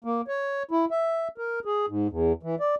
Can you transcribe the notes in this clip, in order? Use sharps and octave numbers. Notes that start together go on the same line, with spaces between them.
A#3
C#5
E4
E5
A#4
G#4
G#2
E2
E3
D5